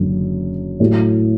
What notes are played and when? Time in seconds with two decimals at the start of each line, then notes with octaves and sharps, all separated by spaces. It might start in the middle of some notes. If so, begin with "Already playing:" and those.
Already playing: F#1 F#2 D3
0.80 A2 F#3 A3